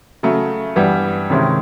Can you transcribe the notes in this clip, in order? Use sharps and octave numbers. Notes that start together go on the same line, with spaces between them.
C#3 F#3 A3
G2 E3 G3 B3
C3 D#3 G#3 C#4 E4